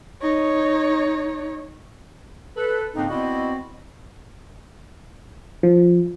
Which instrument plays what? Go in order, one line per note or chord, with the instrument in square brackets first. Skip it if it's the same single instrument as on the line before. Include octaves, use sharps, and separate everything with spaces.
[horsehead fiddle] D#4 C#5
[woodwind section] A4 B4
G#2 C#3 A#3 C4 D4 D#4
B3 C4 E4 F#4 D5 D#5
[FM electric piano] F3